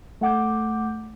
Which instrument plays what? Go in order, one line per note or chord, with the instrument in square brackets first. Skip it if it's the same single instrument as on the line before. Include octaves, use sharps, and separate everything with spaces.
[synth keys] A3 F#5 D6 G6